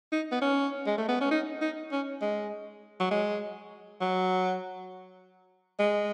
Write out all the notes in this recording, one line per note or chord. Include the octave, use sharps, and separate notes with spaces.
D#4
B3
C#4
G#3
A3
B3
C#4
D#4
D#4
C#4
G#3
F#3
G#3
F#3
G#3